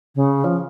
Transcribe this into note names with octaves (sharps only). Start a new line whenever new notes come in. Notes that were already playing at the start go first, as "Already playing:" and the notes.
C#3
F3